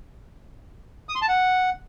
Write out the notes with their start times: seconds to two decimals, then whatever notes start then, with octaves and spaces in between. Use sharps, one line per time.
1.09 D#6
1.15 C6
1.22 A5
1.28 F#5